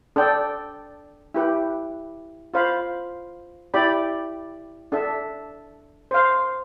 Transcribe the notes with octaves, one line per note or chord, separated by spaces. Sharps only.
D4 A4 D5 G5
E4 G4 B4
F4 C5 F5 B5
E4 G4 D5 G5 B5
D4 A4 E5
C5 F5 C6